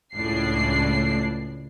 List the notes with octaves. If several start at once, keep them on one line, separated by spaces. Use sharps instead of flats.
C#2 A2 D4 C7